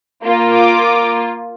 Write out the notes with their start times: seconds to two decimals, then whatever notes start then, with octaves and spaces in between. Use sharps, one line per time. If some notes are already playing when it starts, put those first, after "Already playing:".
0.24 A#3 F4
0.54 D6